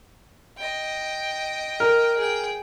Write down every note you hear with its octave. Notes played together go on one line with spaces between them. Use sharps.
D#5 G5
A#4
G#4 G5